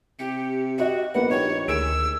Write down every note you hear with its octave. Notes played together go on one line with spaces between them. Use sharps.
C3 G4 C#7
F#4 G4 D#5 E5
A#1 A#3 B3 B4 F#5
D#4 G4 C#5 C#7
D2 D#3 G#4 E6 G#6 D7